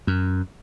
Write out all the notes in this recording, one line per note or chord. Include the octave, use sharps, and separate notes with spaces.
F#2